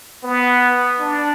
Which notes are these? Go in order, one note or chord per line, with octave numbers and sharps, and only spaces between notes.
B3
D4